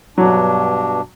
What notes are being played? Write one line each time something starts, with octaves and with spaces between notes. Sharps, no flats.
G2 B2 F#3 D4